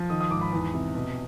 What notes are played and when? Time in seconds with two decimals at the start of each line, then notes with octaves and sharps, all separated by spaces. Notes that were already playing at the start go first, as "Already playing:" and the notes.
Already playing: F3
0.10 D#3 D#6
0.21 D#6
0.30 G#2 D6
0.41 B5
0.52 E2
0.73 C3
0.95 B2